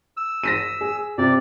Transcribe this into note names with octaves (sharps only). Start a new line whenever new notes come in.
E6
A#6 B6 D#7
G#4
C3 D5